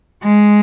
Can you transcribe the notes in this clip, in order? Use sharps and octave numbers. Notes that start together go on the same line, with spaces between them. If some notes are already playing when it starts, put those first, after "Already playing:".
G#3